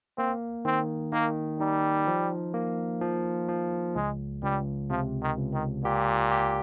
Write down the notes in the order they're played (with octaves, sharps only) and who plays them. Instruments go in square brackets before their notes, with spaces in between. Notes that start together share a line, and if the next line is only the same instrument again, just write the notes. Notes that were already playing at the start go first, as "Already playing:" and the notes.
[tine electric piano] A#3 [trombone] C4
[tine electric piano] D#3 [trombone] C4
[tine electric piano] D#3 [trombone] A#3
[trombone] G3 [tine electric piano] D#4
[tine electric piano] F3
A#3
F3
F3
[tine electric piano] C#2 [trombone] G#3
[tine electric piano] C#2 [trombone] G3
[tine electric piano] C3 [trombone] F3
[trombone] D#3
[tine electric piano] C#2
[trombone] D#3
[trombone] A#2 [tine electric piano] G4
[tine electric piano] G4